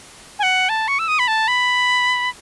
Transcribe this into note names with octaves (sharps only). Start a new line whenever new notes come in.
G#5
F#5
A5
C#6
E6
D#6
B5
A5
B5